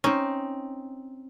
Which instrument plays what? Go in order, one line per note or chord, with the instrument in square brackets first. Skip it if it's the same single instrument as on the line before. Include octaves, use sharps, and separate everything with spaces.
[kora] C4 D#4 [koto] C#4